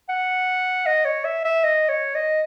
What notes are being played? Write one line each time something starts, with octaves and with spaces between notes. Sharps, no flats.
F#5
D#5
C#5
E5
E5
D#5
C#5
D#5